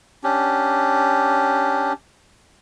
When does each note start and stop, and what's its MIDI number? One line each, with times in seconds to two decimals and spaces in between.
0.24 1.93 61
0.24 1.93 62
0.24 1.93 67